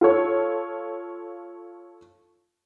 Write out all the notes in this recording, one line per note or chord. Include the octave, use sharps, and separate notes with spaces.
F4 A4 C#5